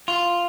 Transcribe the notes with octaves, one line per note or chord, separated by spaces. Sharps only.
F4